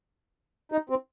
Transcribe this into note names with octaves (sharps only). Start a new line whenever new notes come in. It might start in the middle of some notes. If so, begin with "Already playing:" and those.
D#4
C4